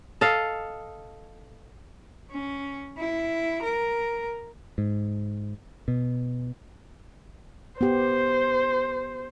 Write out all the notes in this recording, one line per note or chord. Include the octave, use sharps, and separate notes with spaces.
A4 D#5 F5
C#4
E4
A#4
G#2
B2
B3 G4 C5